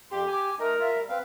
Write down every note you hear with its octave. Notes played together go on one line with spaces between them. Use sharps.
F2 G4 C6
G#5 D6
A3 D#4 A#4 D#5
F4 E5
G3
C4 B4 F5